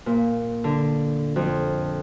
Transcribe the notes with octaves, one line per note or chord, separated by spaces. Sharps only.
A#2
D3
F2